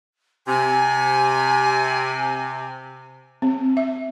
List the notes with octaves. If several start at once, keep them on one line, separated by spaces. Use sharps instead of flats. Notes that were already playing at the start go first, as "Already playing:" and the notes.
C3 G#5
C4
E5